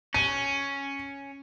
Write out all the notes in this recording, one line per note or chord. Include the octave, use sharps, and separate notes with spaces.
C#4 D#7